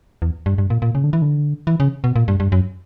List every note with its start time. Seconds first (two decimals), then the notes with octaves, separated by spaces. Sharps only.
0.22 E2
0.46 G2
0.58 G2
0.70 A#2
0.82 A#2
0.95 C#3
1.04 D3
1.13 E3
1.22 D3
1.67 E3
1.80 C#3
2.04 B2
2.16 A#2
2.28 G2
2.40 G2
2.52 F#2